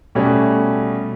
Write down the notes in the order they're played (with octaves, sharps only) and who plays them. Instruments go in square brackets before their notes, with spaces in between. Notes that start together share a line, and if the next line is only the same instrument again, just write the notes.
[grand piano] B2 G3 A3 C#4